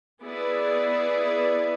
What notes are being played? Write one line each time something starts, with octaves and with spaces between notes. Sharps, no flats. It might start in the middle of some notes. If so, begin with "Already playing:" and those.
B3 E4 G#4 B4 D5